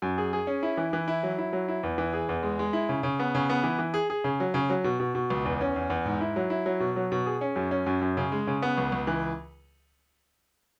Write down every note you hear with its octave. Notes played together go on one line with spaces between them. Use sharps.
F#2
G#4
G#4
C#4
E4
E3
E3
E4
F#3
E4
F#3
E4
E2
E3
G#4
E2
G#3
G#3
E4
C#3
C#3
B3
C#3
B3
E3
E3
G#4
G#4
C#3
F#3
C#3
F#3
B2
B2
B2
C#2
E2
C#4
E2
E2
G#2
E4
F#3
E4
F#3
B2
F#3
B2
G#4
C#4
F#2
C#4
F#2
F#2
C#3
G#3
C#3
B3
C#2
C#2
E3